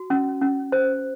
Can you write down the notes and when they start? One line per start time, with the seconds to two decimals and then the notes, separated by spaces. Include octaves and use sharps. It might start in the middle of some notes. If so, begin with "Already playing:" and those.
Already playing: F#4
0.10 C#4
0.41 C#4
0.72 C5